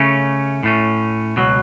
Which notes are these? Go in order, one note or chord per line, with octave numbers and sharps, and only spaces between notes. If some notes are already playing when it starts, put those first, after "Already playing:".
Already playing: C#3 A3 C#4
A2 A3 C#4
C#2 B2 F#3